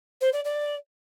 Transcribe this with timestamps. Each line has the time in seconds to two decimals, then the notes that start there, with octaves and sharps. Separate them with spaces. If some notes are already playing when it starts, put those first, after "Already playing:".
0.21 C5
0.33 D5
0.44 D5